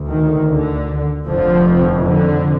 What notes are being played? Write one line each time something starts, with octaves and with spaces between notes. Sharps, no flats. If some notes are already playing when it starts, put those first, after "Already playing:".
Already playing: D2
D#3
D3
F1 F2 D3 F3
D3